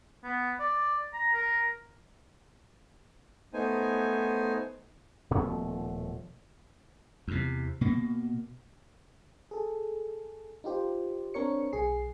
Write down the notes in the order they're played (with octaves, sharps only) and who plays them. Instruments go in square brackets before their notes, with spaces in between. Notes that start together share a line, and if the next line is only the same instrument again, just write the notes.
[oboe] B3
D5
A#5
A#4
[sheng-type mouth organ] A3 B3 D#4 C5 G#5
[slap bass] D#1 B2 F3 A3
E2 C3
B2 A#3
[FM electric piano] G#4 A4
D#4 F4 G4 C5
C4 D4 A#4 C#5 C#7
B1 G#4 C7